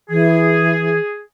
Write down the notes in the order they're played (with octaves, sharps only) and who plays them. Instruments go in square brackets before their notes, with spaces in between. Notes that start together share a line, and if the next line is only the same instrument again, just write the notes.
[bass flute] E3 [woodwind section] G#4